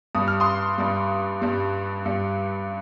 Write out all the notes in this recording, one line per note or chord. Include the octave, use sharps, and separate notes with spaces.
G2 G3 D#6
F6
C6 D#6
G2 G3
G2 G3
G2 G3